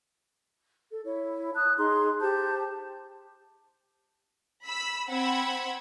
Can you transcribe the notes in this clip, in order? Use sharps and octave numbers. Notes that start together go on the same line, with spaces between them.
A4
E4 C#5
A5 D#6 F#6
D#4 G#4 A#5 C6
G4 C5 A5 G6
B5 E6 B6
C4 F#5 B5 E6 G#6